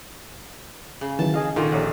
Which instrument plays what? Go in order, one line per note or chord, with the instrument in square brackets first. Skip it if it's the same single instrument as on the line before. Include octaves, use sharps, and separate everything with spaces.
[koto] C#3
[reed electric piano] D#3 E3 F#3 [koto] A5
[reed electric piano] G#4 D#5 F5
[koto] A#2 D3 [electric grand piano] D#3 F4 [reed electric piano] F5 C#6
[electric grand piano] A#1 [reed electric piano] G4 C#5 F#5